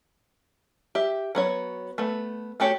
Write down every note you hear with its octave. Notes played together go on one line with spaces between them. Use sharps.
G4 E5
F#3 B3 C#5
A3 B3
A3 F#4 G4 C#5